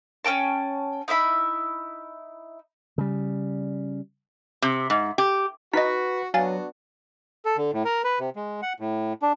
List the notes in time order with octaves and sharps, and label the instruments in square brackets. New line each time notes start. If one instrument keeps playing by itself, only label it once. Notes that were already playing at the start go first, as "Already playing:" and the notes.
[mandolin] C#4 D5 G5 A5
D#4 E4 E5 B5
[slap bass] C#3 G3
[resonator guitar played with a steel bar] C3
G#2
G4
[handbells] D#4 D#5 [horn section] F#4 [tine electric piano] B4 B6
[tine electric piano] F#3 [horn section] B3 D4 F#4 [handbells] F5 G#5 A6
[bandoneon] A4
D3
A2
A#4
B4
C3
G#3
F#5
A2
D4